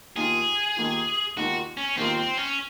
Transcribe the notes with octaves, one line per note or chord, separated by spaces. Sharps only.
D#2 D#3 A#3 F4 G#4
D#2 D#3 A#3 F4
D#2 D#3 A#3 F4 F#4
C#4
D#2 D#3 A#3 C4 F4
C4
C#4